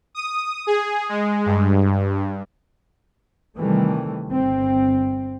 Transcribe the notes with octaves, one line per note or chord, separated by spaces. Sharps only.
D#6
G#4
G#3
G2
C3 D#3 E3 G3 A3
G1 C4